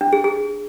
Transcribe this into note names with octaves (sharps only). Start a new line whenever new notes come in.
D4
G#4
G#4